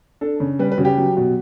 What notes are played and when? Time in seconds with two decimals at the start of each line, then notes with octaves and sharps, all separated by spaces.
0.21 D4 A4
0.40 C#3
0.59 G3 B4
0.72 B4
0.78 C#3 F#4
0.85 G4
0.98 F#3
1.17 B2